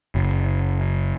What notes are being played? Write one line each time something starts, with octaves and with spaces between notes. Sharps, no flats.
F#1